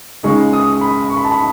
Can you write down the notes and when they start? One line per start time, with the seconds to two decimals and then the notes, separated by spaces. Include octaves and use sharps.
0.23 C#2 C#3 G#3 D#4 C#6
0.53 D#6
0.81 B5
1.10 C#6
1.17 B5
1.24 A5
1.32 B5